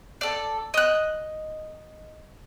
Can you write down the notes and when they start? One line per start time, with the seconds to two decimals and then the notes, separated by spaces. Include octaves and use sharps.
0.21 A4 D5
0.74 D#5 F#6